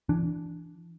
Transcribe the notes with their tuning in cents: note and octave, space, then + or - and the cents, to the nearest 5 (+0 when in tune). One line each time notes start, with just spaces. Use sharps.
E3 +20 D4 -5